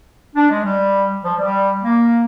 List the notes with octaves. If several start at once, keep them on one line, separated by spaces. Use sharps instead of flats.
D4
G#3
G3
F3
G3
A#3